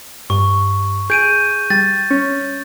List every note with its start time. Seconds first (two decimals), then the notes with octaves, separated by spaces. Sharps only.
0.30 G2 C#6
1.10 G#4 G6 D7 D#7
1.70 G3 A6
2.11 C#4